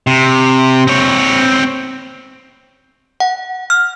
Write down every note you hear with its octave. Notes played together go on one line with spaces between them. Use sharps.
C3
C4 C#5
F#5
F6